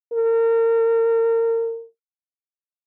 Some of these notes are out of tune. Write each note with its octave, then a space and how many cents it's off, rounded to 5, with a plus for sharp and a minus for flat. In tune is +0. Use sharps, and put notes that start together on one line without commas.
A#4 -30